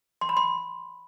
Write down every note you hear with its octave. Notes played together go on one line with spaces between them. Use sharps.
C6
B5
C6